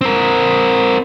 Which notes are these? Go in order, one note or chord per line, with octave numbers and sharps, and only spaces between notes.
C4 A#4